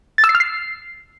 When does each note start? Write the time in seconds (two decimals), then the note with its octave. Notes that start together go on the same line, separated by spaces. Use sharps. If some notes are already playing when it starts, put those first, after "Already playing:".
0.18 A6
0.24 E6
0.29 C7
0.35 F6
0.40 C7